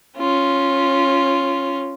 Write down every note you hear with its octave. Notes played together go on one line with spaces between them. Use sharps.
C#4 F4